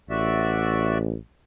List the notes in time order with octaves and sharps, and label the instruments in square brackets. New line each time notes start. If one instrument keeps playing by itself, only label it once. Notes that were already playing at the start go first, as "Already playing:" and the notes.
[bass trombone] A1 [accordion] F#4 D5 E5